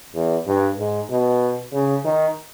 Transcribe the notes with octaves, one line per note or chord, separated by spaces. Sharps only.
E2
G2
G#2
B2
C#3
D#3